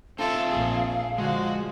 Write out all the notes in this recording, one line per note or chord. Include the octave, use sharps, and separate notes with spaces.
C4 F4 A4 E5 F5
A#1 G#4
D3 F3 G#3 F#4